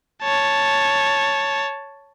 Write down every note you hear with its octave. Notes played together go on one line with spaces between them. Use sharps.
C#5 A5